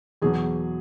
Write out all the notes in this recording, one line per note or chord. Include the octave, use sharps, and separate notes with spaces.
E2 B2 F#3 G#4